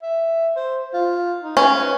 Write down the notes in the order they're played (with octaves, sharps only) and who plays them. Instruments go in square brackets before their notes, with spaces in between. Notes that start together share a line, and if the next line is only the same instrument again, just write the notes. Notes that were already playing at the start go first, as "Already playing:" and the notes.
[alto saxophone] E5
C5
F4
D#4
[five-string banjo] C#4 [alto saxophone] B4